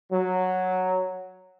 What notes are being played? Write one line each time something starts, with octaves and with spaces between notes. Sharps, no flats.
F#3